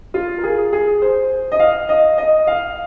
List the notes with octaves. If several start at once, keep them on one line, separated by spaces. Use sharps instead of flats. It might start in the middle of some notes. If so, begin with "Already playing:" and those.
F4
A#4
G#4
G#4
C5
D#5
F5
D#5
D#5
F5